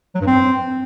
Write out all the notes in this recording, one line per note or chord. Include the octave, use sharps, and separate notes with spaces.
F#3
G2
C4